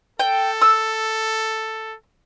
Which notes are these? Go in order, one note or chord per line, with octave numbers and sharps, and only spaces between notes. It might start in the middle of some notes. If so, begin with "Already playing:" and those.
A4 G5
E6